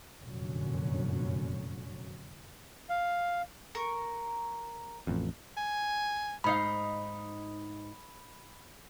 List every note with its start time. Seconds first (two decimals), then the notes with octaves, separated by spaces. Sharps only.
0.22 F1 F#2 A#2 D3 F#3 C#4
2.89 F5
3.75 A#4 C#6
5.07 A1 F2
5.57 G#5
6.44 G#2 D#4 F5 B5